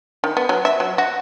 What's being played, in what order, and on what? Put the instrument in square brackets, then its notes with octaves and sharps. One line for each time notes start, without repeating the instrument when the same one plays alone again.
[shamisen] D#3
B3
F#3
E5
F#3
F#4